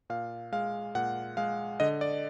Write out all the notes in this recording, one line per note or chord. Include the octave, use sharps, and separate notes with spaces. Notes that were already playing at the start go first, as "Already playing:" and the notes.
A#2 F5
G#3 F5
A#2 F#5
G#3 F5
D3 D#5
D5